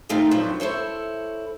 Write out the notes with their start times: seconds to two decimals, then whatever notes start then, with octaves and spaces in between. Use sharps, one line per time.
0.09 D#3 A3 C4 D#4 F4
0.31 G2 F3 F#3 E4 A5
0.60 E4 A4 C5 C#5